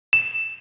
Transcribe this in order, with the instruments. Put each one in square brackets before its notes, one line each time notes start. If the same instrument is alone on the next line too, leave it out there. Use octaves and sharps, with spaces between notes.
[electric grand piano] E7